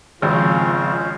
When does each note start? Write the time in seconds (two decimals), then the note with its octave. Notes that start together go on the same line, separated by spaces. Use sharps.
0.22 G#1 C#3 F3 G#3 C4 C#4 F4 C5